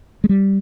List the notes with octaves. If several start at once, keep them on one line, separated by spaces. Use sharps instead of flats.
G#3
G3